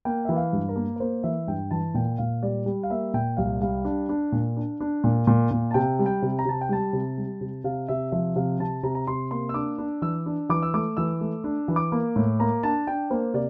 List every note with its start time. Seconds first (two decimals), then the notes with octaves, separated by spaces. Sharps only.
0.05 A#3 G5
0.25 E3 E5
0.36 F5
0.53 G2
0.69 A#4
0.76 A#3
0.96 A#4
1.00 A#3 C5
1.23 E3 E5
1.47 G2 G5
1.71 E3 A5
1.94 A#2 G5
2.18 A#2 F5
2.42 G3 D5
2.66 G3
2.83 F5
2.90 A#3 E5
3.14 A#2 G5
3.37 C2 F5
3.61 G3 F5
3.85 D4
4.09 D4
4.32 A#2
4.57 D4
4.80 D4
5.04 A#2
5.27 A#2
5.51 A#2
5.71 A5
5.74 C3 G5
5.99 G3
6.06 G5
6.22 C3
6.39 A#5
6.45 C3 A5
6.61 G5
6.69 G3 A5
6.93 C3
7.18 G3
7.41 C3
7.64 C3 F5
7.88 C3 E5
8.12 F3 E5
8.36 C3 F5
8.60 C3 A5
8.83 C3 A#5
8.95 A#5
9.07 C3 C6
9.31 A#3 C6
9.49 E6
9.54 D4 D6
9.78 D4
10.02 E3 E6
10.26 D4
10.49 E3 D6
10.63 E6
10.74 A3 D6
10.97 E3 E6
11.21 A3
11.44 D4
11.68 E3
11.76 D6
11.92 A#3
12.16 A2
12.39 A#3 A#5
12.63 D4 A5
12.87 D4 G5
13.10 A#3 C5
13.34 C3 D5